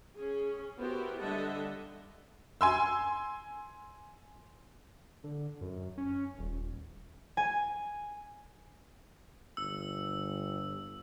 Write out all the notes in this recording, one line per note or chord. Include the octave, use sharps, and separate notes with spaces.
C#4 G#4
B3 E4 F#4 G4 A#4 C5
D3 G3 D#5 E5 F#5 A5
G#5 C6 E6
D3
F#2
C#4
D#1
G#5
G1 E6